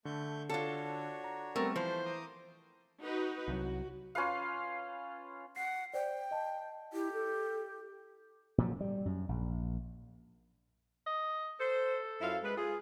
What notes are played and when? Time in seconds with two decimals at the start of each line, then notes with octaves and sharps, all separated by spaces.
0.05 D3 A3 C#6 G6
0.49 D4 F4 F#4 A4 C#5
1.24 A#5
1.56 G3 A3 B3 C4 A#4
1.76 E3 F3 C5 A5 B5
2.05 A#5 D6 D#6
3.03 D#4 F#4 B4
3.48 C2 F3 F#3 F#4
4.15 C#4 F4 B4 F5
5.56 F#5 C7
5.94 C5 D5 G5
6.31 D#5 A5
6.93 E4 G4
7.13 A4
8.58 A#2 F3 F#3
8.81 G3
9.06 F#2
9.29 A#1
11.06 D#5
11.60 A4 C5
12.21 F#2 E4 F5
12.44 G#3 B4
12.57 F4 G#4